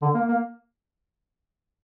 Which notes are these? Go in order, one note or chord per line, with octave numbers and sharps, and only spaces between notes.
D3
A#3
A#3